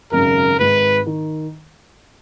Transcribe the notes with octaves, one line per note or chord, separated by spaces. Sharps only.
G#1 F#2 C#3 A#4
G#1 G#2 D#3 B4
D#3